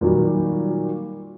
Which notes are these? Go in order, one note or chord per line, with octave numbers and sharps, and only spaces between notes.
A#2 D#3 F#3 G3